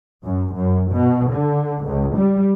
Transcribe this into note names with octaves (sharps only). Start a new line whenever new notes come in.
F#2
F#2
B2
D3
C#2
G3